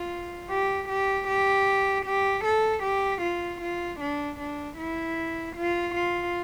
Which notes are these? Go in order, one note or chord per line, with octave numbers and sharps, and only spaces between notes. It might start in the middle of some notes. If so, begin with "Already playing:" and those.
Already playing: F4
G4
G4
G4
G4
A4
G4
F4
F4
D4
D4
E4
F4
F4